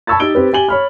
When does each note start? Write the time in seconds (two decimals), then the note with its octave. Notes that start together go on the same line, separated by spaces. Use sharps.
0.07 A5 B5 C#6 E6 G#6 A6
0.20 D#4 G4 E6 D7 G7
0.35 C4 G4 B4
0.53 G4 G#5 F#7 G7
0.69 C#5 B5 F6